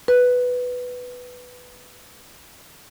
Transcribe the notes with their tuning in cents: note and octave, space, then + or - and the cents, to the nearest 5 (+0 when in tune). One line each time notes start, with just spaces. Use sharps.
B4 +5